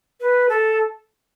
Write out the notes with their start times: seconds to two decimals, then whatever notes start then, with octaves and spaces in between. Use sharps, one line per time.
0.21 B4
0.49 A4